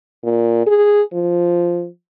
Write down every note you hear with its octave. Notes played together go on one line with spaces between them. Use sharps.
A#2
G#4
F3